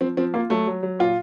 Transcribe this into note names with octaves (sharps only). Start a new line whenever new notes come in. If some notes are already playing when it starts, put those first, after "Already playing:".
F3 C4
F3 C4
A#3 F4
F#3 A3
F#3
F#3
A#2 F4